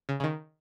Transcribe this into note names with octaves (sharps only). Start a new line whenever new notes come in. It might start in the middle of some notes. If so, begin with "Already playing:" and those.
C#3
C#3
D#3